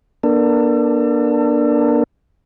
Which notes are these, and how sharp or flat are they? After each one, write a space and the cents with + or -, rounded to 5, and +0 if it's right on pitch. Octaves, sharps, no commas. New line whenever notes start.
A#3 +45 D4 +5 A4 +35